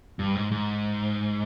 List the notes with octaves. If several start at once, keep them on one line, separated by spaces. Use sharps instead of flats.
G2
G#2
G#2